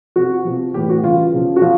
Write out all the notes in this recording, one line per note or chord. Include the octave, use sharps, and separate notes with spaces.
C3 F3 F#4
C3 F3
A2 E3 G3 G4
F#4
C#3 E3 G3 F4
C#3 F3
F#4
F3 F4